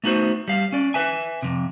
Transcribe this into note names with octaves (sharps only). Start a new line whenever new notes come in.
A3 B3 D#4 F#4 C5
G3 F5
C#4 D5
B4 E5 G#5
F2 C3